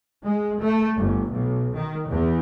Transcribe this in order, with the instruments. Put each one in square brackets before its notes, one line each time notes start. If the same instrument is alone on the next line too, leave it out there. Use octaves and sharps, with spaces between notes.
[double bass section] G#3
A3
G1
B1
D#3
E2